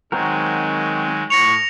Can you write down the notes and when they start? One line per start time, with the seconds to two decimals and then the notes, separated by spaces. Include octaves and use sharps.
0.12 D#3 F#3 G#3 C4 F#4 A#4
1.30 A2 C#6 A#6 C#7 F7